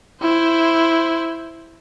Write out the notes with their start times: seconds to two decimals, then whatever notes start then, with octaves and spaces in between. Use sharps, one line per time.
0.21 E4 C5